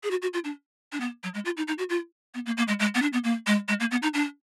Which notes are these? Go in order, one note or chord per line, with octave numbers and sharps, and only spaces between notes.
G#4
F#4
F#4
F4
D4
D4
B3
F#3
G#3
F4
D#4
D#4
F#4
F4
B3
A#3
A#3
G#3
G#3
B3
D4
B3
A#3
G#3
G#3
A#3
B3
D#4
D4